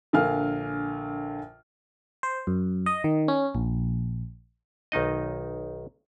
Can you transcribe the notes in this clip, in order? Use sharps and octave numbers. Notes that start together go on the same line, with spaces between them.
A#1 D3 A#4 F5 G#5 F6
C5
F#2
D#5
D#3
C#4
A#1
B1 D#3 D#4 D#5